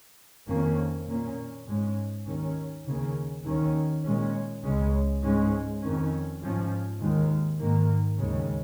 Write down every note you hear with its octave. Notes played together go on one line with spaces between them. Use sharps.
F2 D#3 A#3 C#4
A#2 A#3 C#4
G#2 G#3 C#4
D#2 D#3 C#4
D#2 C#3 A#3 C#4
D#2 D#3 C#4
A#2 G#3 C#4
C#2 C#3 G#3 C#4
G#2 G#3 C#4
F2 D#3 C#4
G#2 F3 C#4
D#2 D#3 G#3
G#2 D#3 A#3
D#2 C#3 G#3 C#4